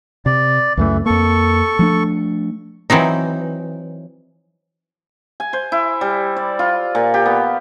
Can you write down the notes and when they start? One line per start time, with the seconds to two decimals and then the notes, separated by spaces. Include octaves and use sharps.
0.26 C3 D5
0.77 C#2 F#2 E3 A3
1.06 F2 A#3 A4 C#6
1.79 F3 A3 D4
2.90 E3 F#3 C4 D#4
5.40 G#5
5.53 C5
5.72 E4
6.01 G3
6.36 D5
6.59 F4
6.95 A#2
7.14 G4
7.26 B3